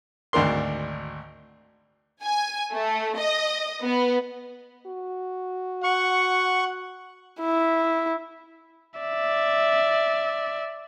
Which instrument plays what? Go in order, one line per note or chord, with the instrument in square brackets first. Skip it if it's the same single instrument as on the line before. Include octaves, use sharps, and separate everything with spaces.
[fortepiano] G#1 D2 D4 A#4 C6
[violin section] G#5
A3
D#5
B3
[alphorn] F#4
[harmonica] F#5 [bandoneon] C#6
[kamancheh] E4
[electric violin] D5 E5